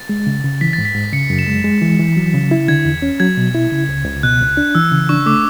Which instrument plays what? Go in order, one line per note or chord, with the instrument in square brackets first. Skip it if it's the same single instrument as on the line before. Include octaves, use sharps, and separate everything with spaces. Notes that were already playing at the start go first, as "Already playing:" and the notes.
Already playing: [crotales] A6
[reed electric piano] G#3
C#3
C#3
[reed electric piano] E3 [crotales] B6
[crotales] A6
[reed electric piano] G#2
[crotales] B6
[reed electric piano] G#2
[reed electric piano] C#3 [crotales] C#7
[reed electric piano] F#2
[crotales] E7
[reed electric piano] G#3
G#3
E3
E3
F#3
C#3
E4
[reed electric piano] D3 [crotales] G#6
[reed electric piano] E2
C#4
[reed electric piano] F#3 [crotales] G#6
[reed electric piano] B2
E4
C#3
C#2
C#2
[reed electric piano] B2 [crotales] F#6
[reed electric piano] C#2
D4
[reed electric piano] E3 [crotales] E6
[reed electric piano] C#3
[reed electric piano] D4 [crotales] C#6
[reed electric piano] A3 [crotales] D6